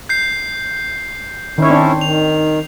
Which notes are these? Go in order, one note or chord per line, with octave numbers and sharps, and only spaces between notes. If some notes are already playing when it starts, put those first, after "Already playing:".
G6 C7
D#3 C#4 E4 C#5
C4 D4
D#3 F7